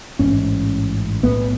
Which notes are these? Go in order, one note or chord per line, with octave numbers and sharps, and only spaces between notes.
A1 G#2 C#4
B1 A2 B3